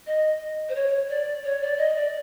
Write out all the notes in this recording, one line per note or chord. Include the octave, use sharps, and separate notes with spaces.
D#5
C5
C#5
D5
C#5
D5
D#5
D5